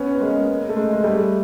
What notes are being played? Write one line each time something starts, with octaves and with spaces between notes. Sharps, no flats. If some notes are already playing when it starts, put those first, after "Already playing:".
Already playing: B3 C#4
B3
G#3 A#3
A3
G#3
G#3
G3 A3